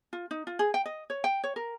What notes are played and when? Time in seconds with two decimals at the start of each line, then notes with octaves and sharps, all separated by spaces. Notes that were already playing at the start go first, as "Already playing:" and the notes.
0.13 F4
0.31 D#4
0.47 F4
0.59 G#4
0.74 G5
0.85 D#5
1.10 C#5
1.24 G5
1.44 C#5
1.56 A#4